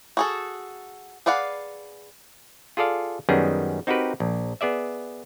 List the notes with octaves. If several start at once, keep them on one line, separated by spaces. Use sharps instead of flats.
F#4 G#4 A4
G#4 B4 D5 F5 F#5
F4 G#4 A4 D5 F5
F#2 D#3 G3 B3 C#4 G#4
C4 D#4 F#4 G4 A#4 B4
A#1
B3 G#4 D5 E5